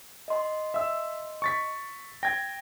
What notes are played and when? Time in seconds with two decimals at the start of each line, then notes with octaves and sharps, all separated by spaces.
0.28 D#5 C6
0.74 E5 E6
1.42 C#6 A6 B6
2.23 G5 G#6 A#6